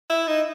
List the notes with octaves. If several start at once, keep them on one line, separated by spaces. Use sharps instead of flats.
E4
D#4